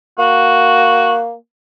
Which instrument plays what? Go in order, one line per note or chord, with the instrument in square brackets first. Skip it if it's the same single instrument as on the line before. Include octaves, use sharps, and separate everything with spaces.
[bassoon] A#3 [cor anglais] F#4